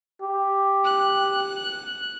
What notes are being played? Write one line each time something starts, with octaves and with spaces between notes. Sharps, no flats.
G4
F#6